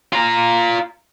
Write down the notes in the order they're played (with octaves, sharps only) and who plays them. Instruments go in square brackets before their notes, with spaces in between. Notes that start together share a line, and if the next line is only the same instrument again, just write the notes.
[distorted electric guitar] F4 A#5